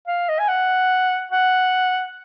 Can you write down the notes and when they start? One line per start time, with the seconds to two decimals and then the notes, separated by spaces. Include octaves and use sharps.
0.07 F5
0.29 D#5
0.39 G#5
0.48 F#5
1.32 F#5